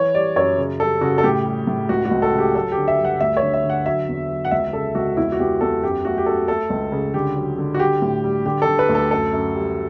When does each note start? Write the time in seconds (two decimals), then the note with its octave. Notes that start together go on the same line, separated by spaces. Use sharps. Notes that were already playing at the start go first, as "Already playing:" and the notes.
Already playing: E3 C#5
0.14 G3 D5
0.36 F#2 C#5
0.58 C#3
0.80 G3 A4
1.01 C#3 F#4
1.18 A4
1.24 A2 G4
1.45 G3
1.67 A2
1.89 C#2 F#4
2.05 F#4
2.11 C#2
2.22 A4
2.33 C#3
2.38 G4
2.55 F#3 A4
2.72 G4
2.77 D3
2.88 E5
2.99 G2
3.05 F#5
3.21 D2 E5
3.37 C#5
3.42 D3
3.54 E5
3.64 D3
3.70 F#5
3.86 F#3 E5
4.08 E2
4.30 F#3
4.45 F#5
4.51 C#2 E5
4.73 C#3 A4
4.95 C#2 F#4
5.17 E2 E4
5.32 F#4
5.39 E2 G4
5.61 E2 A4
5.83 F#2 G4
6.05 A3 F#4
6.18 G4
6.26 F#2 A4
6.48 A3 A4
6.70 C#2
6.92 C#3
7.14 D3 G4
7.36 F#3
7.58 D3
7.74 F#4
7.80 G3 G4
8.02 A2
8.24 G3
8.45 D3 G4
8.62 A4
8.67 D3
8.79 B4
8.89 D2
8.95 A4
9.11 F#2 A4
9.33 F#2
9.55 G3